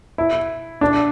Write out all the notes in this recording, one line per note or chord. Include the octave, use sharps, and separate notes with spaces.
E4
D4